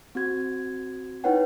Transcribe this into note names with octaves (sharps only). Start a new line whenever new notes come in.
C4 F#4 G#6
D#4 E4 B4 C#5 F#5 G5